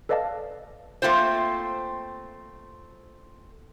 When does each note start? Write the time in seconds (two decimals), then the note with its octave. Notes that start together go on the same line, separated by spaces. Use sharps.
0.09 A4 B4 D5 D#5 F5 A5
1.02 A3 A#3 C4 F4 C5